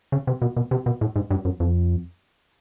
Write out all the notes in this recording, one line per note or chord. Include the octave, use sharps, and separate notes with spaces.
C#3
C3
B2
B2
C3
B2
A2
G#2
G2
F#2
F2